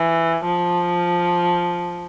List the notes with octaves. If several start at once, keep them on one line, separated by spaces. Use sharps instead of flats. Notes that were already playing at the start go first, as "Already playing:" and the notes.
Already playing: E3
F3